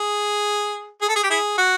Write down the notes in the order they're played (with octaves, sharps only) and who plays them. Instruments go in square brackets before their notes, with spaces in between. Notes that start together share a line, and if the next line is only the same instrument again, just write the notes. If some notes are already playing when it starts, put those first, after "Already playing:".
Already playing: [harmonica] G#4
G#4
A4
G#4
G4
E4 G#4
F#4